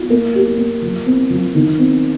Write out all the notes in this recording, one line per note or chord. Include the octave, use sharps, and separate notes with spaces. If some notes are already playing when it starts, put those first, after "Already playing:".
Already playing: F4
A#3
G4
A#3
F3
C4
F3
D#3
C4